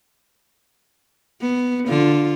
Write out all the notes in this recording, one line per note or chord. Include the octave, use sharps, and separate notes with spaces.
B3
D3 F4